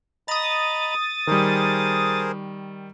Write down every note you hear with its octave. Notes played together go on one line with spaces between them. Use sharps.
D#5 A#5 B5 D#6 A6
D#3 G3 G#4 A#4 C5